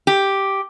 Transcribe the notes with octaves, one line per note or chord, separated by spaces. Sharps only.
G4